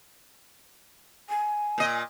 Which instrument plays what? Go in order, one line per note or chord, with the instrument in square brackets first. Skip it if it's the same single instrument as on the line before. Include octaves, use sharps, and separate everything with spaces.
[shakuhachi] G#5
[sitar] A#2 D#5